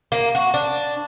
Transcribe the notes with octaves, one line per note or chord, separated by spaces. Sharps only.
A#3
F#4
D4